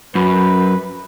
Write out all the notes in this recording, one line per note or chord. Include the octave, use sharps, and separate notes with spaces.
F#2 B4